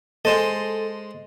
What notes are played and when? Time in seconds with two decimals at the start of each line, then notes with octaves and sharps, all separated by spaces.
0.25 G#3 A4 C5 D#5